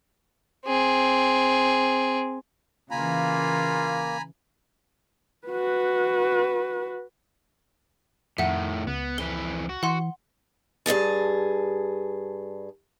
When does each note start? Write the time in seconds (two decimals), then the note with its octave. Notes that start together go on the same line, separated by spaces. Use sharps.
0.66 C4 G#4
2.91 C#3 E3 A#3 F4 G#5 A#5 B5
5.47 F#4 B4
8.38 F2 A2 D#3 E5 F#5
8.87 C#2 B3
9.18 F2 E3 B4 G7
9.69 F#4
9.83 E3 F#5 C6
10.86 G2 B2 G#4 A5